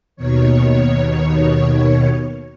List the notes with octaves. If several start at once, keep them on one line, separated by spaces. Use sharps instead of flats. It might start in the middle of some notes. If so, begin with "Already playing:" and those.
D#2 B2 D#3 C#5